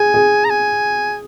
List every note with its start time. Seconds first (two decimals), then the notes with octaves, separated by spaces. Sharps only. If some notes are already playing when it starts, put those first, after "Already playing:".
Already playing: G#4 G#5
0.14 G#4
0.45 A#5
0.50 G#5